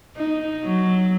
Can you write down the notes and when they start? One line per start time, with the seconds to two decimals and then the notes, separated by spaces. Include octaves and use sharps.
0.16 D#4
0.64 F#3